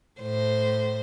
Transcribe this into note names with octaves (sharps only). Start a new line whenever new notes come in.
A2 C5